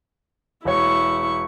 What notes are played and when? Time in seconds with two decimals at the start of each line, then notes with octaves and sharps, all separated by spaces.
0.65 E1 E4 C#5 C#6